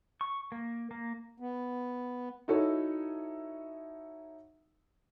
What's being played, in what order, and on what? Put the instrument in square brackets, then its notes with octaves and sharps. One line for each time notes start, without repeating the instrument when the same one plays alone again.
[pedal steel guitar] C#6
A#3
A#3
[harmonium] B3
[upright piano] D#4 E4 F#4 A4 C#5